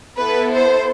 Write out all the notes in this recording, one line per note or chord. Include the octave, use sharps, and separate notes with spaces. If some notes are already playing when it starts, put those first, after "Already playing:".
B3 E4 A4 B4
C5